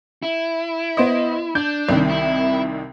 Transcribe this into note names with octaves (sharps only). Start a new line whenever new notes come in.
E4
B3 C5 D#5
D4 G6
C2 C3 D#3
E4